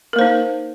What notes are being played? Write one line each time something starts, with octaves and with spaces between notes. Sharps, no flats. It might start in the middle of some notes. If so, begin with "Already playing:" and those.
A#3 D#4 A#4 C5